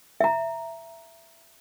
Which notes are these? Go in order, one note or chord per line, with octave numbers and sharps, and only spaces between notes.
E5 A#5